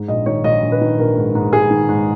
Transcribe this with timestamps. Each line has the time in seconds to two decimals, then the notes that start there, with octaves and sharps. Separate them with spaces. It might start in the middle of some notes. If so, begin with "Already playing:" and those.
Already playing: G#2
0.08 A#1 D#5
0.26 D#3 C#5
0.44 A#1 D#5
0.62 A#1
0.72 B4
0.81 D#3
0.98 A#1 A#4
1.17 G#2
1.35 G#2
1.53 G#2 G#4
1.70 D#3
1.89 G#2